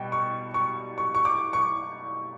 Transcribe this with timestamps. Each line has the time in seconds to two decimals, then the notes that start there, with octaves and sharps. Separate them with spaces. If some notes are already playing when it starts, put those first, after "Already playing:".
Already playing: B2 G3 G5
0.12 C#6
0.54 C#6
0.98 C#6
1.15 C#6
1.25 D6
1.53 C#6